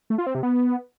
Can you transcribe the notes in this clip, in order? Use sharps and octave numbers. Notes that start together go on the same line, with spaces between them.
A3
F4
C4
C3
B3